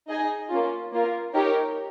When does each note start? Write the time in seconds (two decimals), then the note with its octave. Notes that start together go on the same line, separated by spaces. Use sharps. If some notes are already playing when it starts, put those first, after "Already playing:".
0.09 D#4 G#4 D#5 G#5
0.50 A#3 C#4 F4
0.92 A#3 F4 A#4
1.34 D#4 G4 A#4 C#5